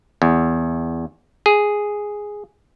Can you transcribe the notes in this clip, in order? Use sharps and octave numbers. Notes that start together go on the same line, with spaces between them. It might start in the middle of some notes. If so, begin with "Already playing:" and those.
E2
G#4